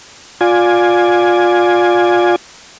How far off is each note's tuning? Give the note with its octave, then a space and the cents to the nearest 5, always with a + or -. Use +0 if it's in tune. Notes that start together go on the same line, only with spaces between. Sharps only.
F4 +20 D5 +0 G#5 +0